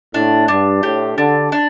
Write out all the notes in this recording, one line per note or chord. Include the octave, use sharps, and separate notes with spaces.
A2 D4
G2 D4
A2 G4
D3 D4
D4